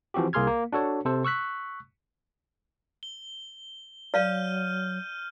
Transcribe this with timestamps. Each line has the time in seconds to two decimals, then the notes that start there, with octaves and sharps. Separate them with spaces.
0.14 E3 F3 C4 F#4 G4
0.33 C2 A#3 G#4 C6 F6 G#6
0.47 A#3
0.73 D4 F#4 A4 C#5
1.05 C3 A4 C5
1.25 C#6 E6 F#6 B6
3.03 G7
4.14 F#3 D5 F5 F6 G6 D#7